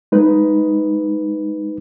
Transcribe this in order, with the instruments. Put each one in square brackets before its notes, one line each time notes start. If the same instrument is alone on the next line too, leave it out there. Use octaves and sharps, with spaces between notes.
[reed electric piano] G#3 D#4 B4